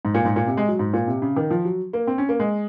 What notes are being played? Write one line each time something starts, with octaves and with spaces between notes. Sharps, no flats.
G#2
A#2
G#2
A#2
C3
G#3
F#3
G#2
A#2
C3
C#3
D#3
F3
F#3
A#3
C4
C#4
A#3
G#3